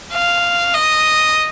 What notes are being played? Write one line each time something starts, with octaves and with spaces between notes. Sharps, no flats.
F5
D#5